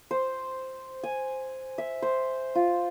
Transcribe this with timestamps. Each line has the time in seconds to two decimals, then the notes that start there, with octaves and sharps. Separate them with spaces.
0.11 C5
1.03 G#5
1.78 E5
2.02 C5
2.55 F4